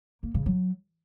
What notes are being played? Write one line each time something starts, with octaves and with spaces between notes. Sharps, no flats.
A#3
C#3
F#3